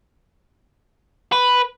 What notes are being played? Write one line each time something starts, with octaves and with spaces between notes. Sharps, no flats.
B4